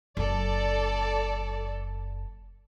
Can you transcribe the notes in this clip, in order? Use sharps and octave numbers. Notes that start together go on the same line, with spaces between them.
F#1 F#2 A4 D5